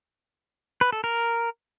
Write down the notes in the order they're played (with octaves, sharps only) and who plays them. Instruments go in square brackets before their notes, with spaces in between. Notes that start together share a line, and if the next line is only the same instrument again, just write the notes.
[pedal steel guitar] B4
A4
A#4